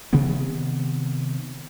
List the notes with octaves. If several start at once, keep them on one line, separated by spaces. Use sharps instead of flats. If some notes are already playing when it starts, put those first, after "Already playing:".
C3 D#3 B3 C4